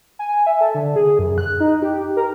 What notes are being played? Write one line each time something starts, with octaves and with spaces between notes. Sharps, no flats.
G#5
E5
A4
D3
G#4
F#2
F#6
D#4
G4
A#4